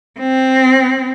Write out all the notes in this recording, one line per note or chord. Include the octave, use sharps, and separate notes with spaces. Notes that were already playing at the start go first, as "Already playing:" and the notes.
C4